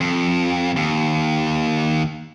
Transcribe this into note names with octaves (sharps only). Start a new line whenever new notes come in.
F2
D#2